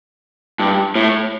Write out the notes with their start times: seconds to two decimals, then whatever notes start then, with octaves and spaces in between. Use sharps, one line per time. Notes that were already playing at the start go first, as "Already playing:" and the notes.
0.60 G2
0.95 A2